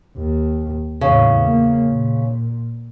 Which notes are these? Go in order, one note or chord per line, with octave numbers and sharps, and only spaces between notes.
D#2
E2 A2 C#3
A#3
A#2